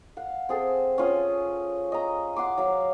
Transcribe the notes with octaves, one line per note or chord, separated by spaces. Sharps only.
F5 F#5
C4 G#4 A4
C#4 F4 D#6
D#5 A#5
F#5 C6 D6
F#3 F5